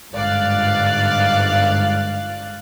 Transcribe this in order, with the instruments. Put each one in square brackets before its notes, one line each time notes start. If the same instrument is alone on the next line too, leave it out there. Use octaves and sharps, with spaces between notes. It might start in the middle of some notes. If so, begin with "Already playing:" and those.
[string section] G1 G#2 D5 F5 F#6 A6